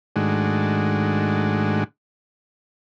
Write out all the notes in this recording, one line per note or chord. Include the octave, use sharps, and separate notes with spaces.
G#2 D#3 G#3 A3 D4 F#4